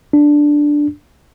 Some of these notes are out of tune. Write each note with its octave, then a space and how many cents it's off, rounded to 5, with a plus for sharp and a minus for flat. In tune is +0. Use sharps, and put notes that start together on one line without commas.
D4 +0